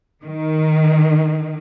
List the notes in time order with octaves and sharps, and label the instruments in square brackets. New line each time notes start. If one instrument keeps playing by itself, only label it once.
[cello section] D#3